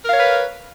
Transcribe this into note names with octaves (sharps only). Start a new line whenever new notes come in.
A#4 B4 C#5 F5